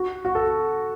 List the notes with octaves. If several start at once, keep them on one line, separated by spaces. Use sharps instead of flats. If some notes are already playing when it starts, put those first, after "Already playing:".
Already playing: F#4
F#4
A4